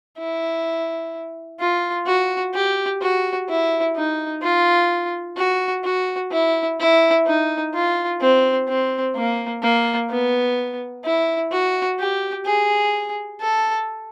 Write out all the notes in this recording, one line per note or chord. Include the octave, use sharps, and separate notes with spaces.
E4
F4
F#4
G4
F#4
E4
D#4
F4
F#4
F#4
E4
E4
D#4
F4
C4
C4
A#3
A#3
B3
E4
F#4
G4
G#4
A4